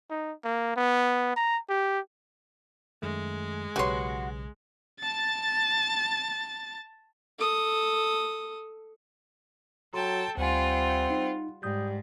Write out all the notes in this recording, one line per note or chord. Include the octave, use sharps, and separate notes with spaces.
D#4
A#3
B3
A#5
G4
F#2 D#3 G#3 A3
B1 C#3 F#4 G4 B4 C#5 C6
A5 A6
A4 D#6
F#3 A4 G5 A5 A#5 C6
D2 G3 C4 F4 F#5 G#5
D#4
G#2 G3 D#6 G6